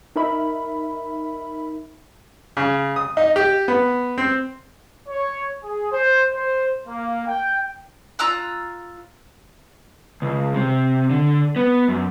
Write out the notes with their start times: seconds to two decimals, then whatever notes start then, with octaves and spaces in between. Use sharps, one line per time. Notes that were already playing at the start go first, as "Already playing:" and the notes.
0.16 D#4 A#4 E5 B5
2.57 C#3
2.96 D#6
3.17 D#4
3.36 G4
3.68 B3
4.18 C4
5.09 C#5
5.62 G#4
5.91 C5
6.33 C5
6.87 A#3
7.27 G5
8.19 F4 A#5 E6 F#6
10.22 C#2
10.54 C3
11.10 D3
11.56 B3
11.88 F#2